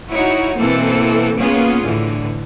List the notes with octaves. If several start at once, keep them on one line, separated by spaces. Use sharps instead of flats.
D#4 E4 F#4 C#5
B2 E3 A#3 C4 A4
A#3 B3 C#4 F4 G#4
A2 D3 E3